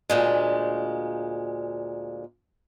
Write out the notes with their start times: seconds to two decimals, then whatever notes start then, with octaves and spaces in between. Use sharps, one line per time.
0.10 D2 A#2 G#3